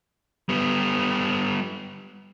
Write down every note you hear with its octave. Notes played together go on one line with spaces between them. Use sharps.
G3 B3